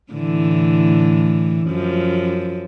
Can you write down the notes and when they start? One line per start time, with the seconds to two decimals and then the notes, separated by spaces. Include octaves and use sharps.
0.12 A2 D3 E3
1.67 F#2 F3